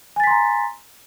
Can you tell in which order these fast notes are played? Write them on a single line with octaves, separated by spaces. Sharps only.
G#5 A6 B6 C6 A#5